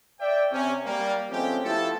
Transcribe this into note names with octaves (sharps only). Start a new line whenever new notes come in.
D5 E5 G5
C3 C#4
G3 A#3
F3 G#3 A3 C4 C#4 G4
F3 A3 B3 E4 G4 A4